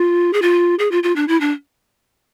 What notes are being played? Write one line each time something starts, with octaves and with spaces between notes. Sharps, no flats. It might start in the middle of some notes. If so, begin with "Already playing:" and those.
Already playing: F4
G#4
F4
G#4
F4
F4
D4
E4
D4